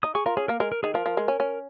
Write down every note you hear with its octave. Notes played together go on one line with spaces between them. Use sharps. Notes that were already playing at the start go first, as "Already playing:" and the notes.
D#4 D#6
G#4 C#6
F4 A#4
C#4 G#4
A#3 A#4
G#3 A#4
A#4
D#3 G#4
F3 A#4
F3
G#3
C#4
C#4